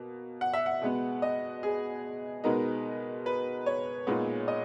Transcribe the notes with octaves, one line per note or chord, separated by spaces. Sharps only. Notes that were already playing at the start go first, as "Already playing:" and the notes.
Already playing: B2 A#3
F#5
E5
F#5
B2 G#3 B3
D#5
G#4
B2 G#3 B3 D#4 A#4
B4
C#5
A#2 G#3 B3 D#4
D#5